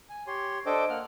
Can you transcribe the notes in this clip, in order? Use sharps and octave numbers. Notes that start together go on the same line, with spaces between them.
G#5
G4 C#5 C6
D4 A4 C5 D#5 G5 D6
A#3 F#5 F6